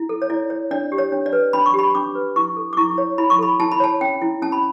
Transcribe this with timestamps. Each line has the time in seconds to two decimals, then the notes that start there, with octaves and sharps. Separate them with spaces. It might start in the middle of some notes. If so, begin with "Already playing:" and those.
Already playing: E4
0.09 A4
0.22 C#5
0.30 E4 D5
0.50 C#5
0.71 D4 D5
0.92 G4
0.98 C#5
1.12 D4
1.26 D5
1.33 B4
1.53 D4 B5
1.66 C#6
1.74 G4
1.79 B5
1.95 D4 D6
2.15 B4
2.36 E4 C#6
2.57 A4
2.73 D6
2.77 E4 C#6
2.98 C#5
3.18 E4 B5
3.30 C#6
3.39 A4 B5
3.60 E4 A5
3.72 B5
3.80 C#5 A5
4.01 C#4 G5
4.22 E4
4.42 C#4 A5
4.52 B5